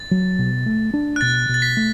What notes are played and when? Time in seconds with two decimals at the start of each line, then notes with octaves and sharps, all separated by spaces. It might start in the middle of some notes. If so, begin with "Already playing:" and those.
Already playing: A6
0.11 F#3
0.39 B2
0.66 A3
0.94 D4
1.16 F#6
1.21 B2 A6
1.49 B2
1.54 A6
1.62 B6
1.77 A3